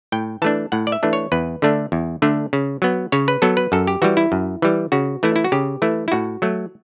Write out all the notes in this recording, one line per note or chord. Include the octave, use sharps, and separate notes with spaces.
A2 G5
E3 A3 D4 A5
A2 F#5
D5
E5
E3 A3 D4
C#5
E2 B4
D3 A3 D4
E2
D3 A3 D4
C#3
F#3 B3
C#3 C#5
B4
F#3 B3 A4
B4
F#2 A4
G4
E3 G3 F#4
E4
F#2
E3 G3
C#3 F#4
E3 A3 E4
E4
F#4
C#3 G4
E3 A3 E4
E4
A2 F#4
F#3 A3